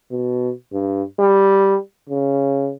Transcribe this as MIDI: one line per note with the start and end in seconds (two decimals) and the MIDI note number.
0.11 0.51 47
0.72 1.03 43
1.19 1.77 55
2.09 2.72 49